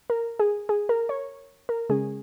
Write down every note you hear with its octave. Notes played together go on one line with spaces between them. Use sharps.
A#4
G#4
G#4
A#4
C#5
A#4
C#3 G#3 C#4 G#4